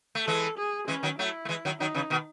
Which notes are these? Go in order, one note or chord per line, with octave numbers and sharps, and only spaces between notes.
A3
E3 G#3 A4
G#4
E3 G#3 C#4
D#3 F#3
F#3 A3 E4
A3
E3 G#3
D#3 F#3
D#3 F#3 D#4
C#3 E3
B2 D#3